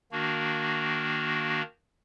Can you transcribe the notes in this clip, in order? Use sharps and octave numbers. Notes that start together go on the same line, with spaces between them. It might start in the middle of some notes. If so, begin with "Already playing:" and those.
D#3 A#3 D4 F#4